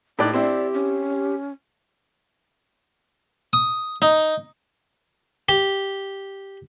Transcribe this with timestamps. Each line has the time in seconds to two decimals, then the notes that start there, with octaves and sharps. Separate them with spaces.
0.19 A2 D#4 G4 D5 F#6
0.33 C4 E4 D5
0.74 C#4
3.53 D#6
4.02 D#4
5.49 G4